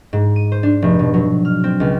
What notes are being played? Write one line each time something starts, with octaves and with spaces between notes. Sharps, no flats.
G#2
D#7
C5
D4
F1
B2
F#3
F6
C4
C#2